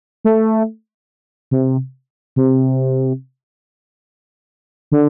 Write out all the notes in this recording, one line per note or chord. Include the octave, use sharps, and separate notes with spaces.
A3
C3
C3
D3